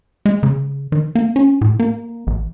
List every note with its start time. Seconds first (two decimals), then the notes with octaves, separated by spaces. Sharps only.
0.26 G#3
0.43 C#3
0.92 D#3
1.15 A#3
1.36 C#4
1.61 A2
1.79 A#3
2.27 A1